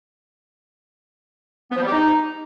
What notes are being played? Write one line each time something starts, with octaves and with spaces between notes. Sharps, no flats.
B3
F3
G3
G4
D#4